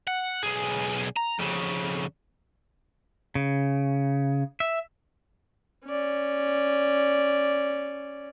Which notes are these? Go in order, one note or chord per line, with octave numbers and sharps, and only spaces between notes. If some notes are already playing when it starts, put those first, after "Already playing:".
F#5
B1 G#4
A#5
F2 C#3
C#3
E5
C#4 D5